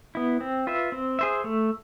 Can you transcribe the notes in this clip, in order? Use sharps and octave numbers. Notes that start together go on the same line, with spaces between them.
B3 E4
C4
F4 B4 E5
C4
G#4 C5 E5
A3